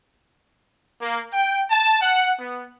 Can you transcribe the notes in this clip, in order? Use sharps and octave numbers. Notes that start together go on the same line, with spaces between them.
A#3
G5
A5
F#5
B3